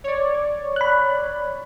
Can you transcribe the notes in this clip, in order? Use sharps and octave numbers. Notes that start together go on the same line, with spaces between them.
C#5 D5
B5 F#6